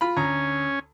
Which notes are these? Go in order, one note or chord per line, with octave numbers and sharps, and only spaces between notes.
F4 B5
D2 C#4 A#5